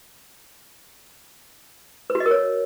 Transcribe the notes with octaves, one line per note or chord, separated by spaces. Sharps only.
B4
F#4
D#5
A#4
C#5